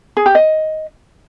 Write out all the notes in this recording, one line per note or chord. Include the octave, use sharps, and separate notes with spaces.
G#4
G4
D#5